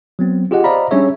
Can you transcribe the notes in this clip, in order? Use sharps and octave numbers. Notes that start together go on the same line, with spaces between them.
F#3 B3 C4
F4 G4 G#4 D#5 F#5
C5 D5 D#5 F5 A#5 B5
G3 C#4 D4 G#4 C#5 E5